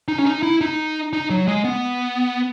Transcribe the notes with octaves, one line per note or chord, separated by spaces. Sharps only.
D#4
C#4
D#4
E4
D#4
D#4
F#3
G#3
B3